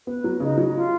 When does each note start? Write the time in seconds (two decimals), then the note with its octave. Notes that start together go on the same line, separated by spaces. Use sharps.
0.06 B3 B4
0.24 F#3
0.40 C#3 D#4
0.58 F#3
0.74 F4